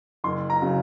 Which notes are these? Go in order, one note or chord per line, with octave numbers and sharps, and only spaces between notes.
F#1 C6
A#5
C#3 F#3